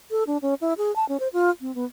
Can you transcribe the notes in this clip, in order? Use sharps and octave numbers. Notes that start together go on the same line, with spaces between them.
A4
D4
C#4
E4
G#4
A5
C#4
C5
F4
C4
B3